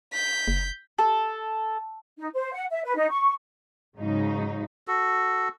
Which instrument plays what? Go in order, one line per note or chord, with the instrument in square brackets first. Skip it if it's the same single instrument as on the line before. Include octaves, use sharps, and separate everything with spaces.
[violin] G6 B6
[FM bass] F#1
[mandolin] A4
[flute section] D#4
C5
F#5
E5
B4
D#4
C#6
[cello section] G#2 C#3 F#3 D#4
[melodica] F#4 A4